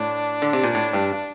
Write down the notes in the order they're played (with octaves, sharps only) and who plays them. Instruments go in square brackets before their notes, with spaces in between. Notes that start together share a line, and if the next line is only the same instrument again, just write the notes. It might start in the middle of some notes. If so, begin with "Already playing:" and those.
Already playing: [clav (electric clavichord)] A2 [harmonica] D4
[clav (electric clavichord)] D3
C3
A#2
A2
G2